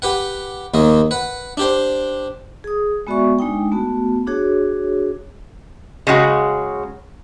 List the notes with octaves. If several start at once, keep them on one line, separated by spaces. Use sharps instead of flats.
G4 B4 F#5
D#2 D#3 A#3 D#5
B4 F#5
D4 G4 C5
G#4 D#6
G#3 B3 F#4 D5 E5 C#6
G#3 D4 D#4 G5
A3 B3 F#4
D4 F#4 G#4 C#5
C#3 F#3 G#3 F#4